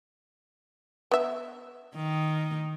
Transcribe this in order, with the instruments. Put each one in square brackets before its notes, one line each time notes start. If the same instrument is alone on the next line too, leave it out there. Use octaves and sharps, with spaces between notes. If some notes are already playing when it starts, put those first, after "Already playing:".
[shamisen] B3 E5
[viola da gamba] D#3